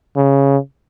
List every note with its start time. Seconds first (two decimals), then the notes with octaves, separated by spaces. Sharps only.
0.17 C#3